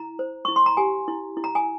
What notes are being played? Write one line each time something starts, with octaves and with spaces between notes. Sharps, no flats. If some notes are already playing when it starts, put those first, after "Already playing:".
Already playing: E4 A#5
C5
E4 C#6
C6
A#5
G4 G#5
E4
E4
A#5
G#5